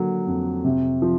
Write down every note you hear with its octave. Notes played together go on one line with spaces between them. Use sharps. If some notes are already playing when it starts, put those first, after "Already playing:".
Already playing: D3 F#3 A#3
F2
C3
F3